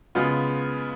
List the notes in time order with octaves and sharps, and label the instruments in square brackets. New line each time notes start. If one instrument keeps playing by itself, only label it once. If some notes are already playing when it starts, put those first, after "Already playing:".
[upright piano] C#3 G#3 B3 F4